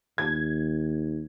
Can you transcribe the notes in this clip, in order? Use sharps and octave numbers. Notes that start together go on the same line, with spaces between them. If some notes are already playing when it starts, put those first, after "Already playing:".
D#2 G#6